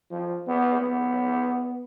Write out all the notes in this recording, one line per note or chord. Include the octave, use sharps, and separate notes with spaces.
F3
B3
B3